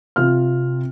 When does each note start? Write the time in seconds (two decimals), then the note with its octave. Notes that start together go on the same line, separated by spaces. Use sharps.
0.16 C3 F4 F6